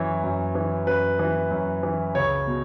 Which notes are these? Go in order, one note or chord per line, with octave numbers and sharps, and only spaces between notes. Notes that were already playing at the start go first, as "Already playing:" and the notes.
Already playing: F#2 E3 C#5
F#2
E3
F#2 B4
E3
F#2
E3
C#2 C#5
B2